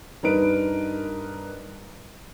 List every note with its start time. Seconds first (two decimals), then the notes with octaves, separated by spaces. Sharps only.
0.23 G2 D#4 A#4 B4 D7